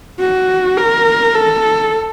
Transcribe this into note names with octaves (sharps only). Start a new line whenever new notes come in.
F#4
A#4
A4